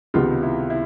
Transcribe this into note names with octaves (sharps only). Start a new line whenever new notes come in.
C#2 C3 D#3 G#3 B3 F4
E4
E4